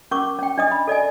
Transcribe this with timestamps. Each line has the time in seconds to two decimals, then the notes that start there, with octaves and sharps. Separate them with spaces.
0.11 C#4 A#4 C#6 D6
0.39 C#4 G5
0.58 D4 D#5 D#6
0.72 B5
0.88 A4 D5 D#5 G#5